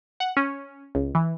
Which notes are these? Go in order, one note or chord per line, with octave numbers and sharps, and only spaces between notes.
F#5
C#4
C#2
E3